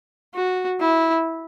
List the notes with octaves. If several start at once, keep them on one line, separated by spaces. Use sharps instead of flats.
F#4
E4